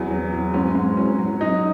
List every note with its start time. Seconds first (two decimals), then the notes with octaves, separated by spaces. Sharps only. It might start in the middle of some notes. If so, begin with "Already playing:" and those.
Already playing: E2 F#3
0.11 F#3
0.32 F#3
0.54 G#2 C#4
0.75 G#2
0.97 F#3 C#4
1.19 F#3
1.40 F#3 D#4